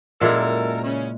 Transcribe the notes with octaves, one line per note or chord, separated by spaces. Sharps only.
F#2 A#2 G#3 E4 A4 A#4
C#3 C#4